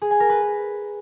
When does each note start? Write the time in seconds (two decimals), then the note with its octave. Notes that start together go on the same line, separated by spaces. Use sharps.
0.02 G#4
0.11 G#5
0.20 A#4
0.29 B4